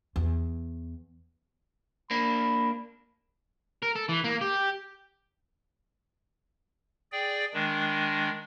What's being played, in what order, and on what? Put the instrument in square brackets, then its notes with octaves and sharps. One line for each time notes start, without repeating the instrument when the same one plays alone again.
[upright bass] E2
[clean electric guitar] A#3 D4 [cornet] B5
[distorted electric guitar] A#4
A4
E3
A#3
G4
[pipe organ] G#4 D5 G5
D#3 G#3 D4